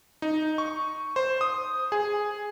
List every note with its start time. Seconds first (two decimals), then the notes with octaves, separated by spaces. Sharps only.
0.22 D#4
0.58 C#6
1.16 C5
1.41 D#6
1.92 G#4